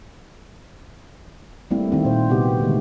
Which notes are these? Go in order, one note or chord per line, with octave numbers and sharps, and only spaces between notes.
G3 A3 A#3 C4 E4
D#3 C4 E4
A#2 C5
C3 B3 F#4 G4
D3 D#3 G#3 A3